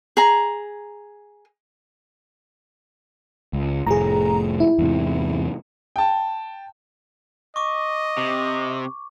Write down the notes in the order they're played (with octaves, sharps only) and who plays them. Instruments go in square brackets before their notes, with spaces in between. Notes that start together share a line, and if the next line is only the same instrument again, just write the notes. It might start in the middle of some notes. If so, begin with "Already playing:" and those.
[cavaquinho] G#4 A#5
[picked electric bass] C#2
[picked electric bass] F1 A2 [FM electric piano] G#4 A#5
[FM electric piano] E4
[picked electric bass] E2 G#2 C3
[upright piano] G5 A5
[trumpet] D#5 [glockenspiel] C#6 D6
[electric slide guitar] C3